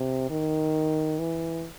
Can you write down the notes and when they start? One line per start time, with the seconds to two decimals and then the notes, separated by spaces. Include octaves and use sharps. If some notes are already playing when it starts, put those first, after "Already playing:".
Already playing: C3
0.30 D#3
1.19 E3